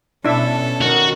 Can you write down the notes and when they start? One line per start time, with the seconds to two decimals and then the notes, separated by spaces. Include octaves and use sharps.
0.25 B2 C#4 D4 E4 A4 E5
0.81 D#3 F#4